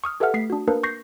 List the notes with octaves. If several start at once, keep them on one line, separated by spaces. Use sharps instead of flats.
C#6 D#6 F6
G4 A4 B4 E5 F#5 F6
A3 B6 C7
D4 F#4
A#3 D4 A#4 B4
C#6 G6 A#6 C7